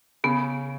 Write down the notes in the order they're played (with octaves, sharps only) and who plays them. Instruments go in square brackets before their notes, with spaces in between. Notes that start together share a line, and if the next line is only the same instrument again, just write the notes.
[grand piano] C#3 [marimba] B3